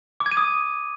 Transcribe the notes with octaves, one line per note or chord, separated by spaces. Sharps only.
D6
G#6
D#7
D#6